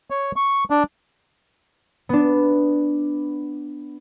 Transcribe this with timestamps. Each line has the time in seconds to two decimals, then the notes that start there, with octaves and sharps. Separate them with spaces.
0.10 C#5
0.36 C#6
0.70 D4
2.09 B3 D4